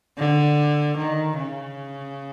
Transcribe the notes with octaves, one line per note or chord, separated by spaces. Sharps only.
D3
D#3
C#3